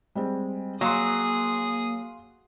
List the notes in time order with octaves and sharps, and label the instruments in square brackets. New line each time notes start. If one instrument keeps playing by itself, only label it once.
[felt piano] G3 G#3 C4
[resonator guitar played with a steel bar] F#3 [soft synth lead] A#3 [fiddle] G#4 D#6 [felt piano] F5 C6